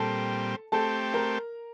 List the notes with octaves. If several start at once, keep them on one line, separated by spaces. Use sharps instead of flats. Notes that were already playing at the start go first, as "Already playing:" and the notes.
Already playing: A#2 G3 C4 A4 A5
A3 C4 G4 A4 A5
A#4 A#5